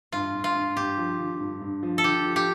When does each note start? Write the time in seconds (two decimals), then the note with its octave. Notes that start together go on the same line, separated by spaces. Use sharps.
0.12 G2 F4
0.35 G2
0.44 F4
0.55 G2
0.76 G2 G4
0.98 F3
1.19 D3
1.40 G2
1.61 G2
1.83 F3
1.98 A4
2.04 D3 G4
2.25 F3
2.36 G4